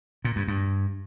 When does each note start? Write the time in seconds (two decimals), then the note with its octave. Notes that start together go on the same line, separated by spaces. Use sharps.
0.25 A#2
0.36 G2
0.48 G2